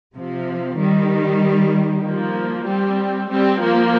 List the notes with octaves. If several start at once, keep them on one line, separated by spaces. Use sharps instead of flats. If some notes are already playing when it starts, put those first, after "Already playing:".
C3 F3
D#3 G3
F3 A#3
G3 C4
G3 C4
F3 A#3